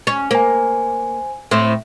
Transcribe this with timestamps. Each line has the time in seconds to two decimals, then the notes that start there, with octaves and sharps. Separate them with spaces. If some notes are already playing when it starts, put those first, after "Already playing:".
0.07 C#4
0.31 A#3 C5 G#5
1.51 A2 C4